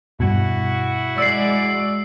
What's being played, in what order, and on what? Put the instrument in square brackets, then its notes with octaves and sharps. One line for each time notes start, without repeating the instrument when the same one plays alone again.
[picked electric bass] G2 B2 [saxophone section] E4 F#4
[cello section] G#3 D5 [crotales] E6 C7